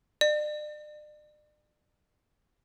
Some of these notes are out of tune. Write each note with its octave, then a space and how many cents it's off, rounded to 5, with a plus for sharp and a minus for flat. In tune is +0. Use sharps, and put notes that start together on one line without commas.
D5 +40